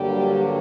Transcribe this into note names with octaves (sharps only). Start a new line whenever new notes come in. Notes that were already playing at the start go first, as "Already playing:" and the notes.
Already playing: G2 D3 F#3 G3 A#3 G4